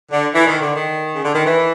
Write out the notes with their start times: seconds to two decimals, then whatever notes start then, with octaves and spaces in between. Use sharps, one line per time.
0.11 D3
0.34 E3
0.47 D#3
0.61 D3
0.74 D#3
1.13 C#3
1.24 D3
1.34 D#3
1.45 E3